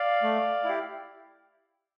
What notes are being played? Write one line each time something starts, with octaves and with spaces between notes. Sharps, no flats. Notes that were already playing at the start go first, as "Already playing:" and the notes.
Already playing: D5 F5
A3
E4 G4